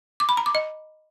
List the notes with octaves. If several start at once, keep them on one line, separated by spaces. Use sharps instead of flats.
D6
B5
A#5
D6
D#5